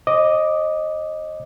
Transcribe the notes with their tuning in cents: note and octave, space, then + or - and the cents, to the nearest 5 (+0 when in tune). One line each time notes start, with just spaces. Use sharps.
C5 +45 D#5 +0 D6 +0